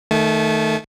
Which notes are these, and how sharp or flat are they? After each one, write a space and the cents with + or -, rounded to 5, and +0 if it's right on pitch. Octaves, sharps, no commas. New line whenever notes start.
D#3 -5 A3 +0 A5 -45